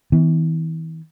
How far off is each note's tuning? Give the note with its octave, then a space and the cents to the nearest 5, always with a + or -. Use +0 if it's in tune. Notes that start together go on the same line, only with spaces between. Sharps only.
E3 -40 B3 +15